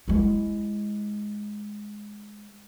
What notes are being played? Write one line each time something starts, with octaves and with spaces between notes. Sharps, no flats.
G#3 E4